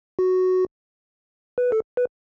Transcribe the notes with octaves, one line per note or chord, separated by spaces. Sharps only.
F#4
B4
A4
B4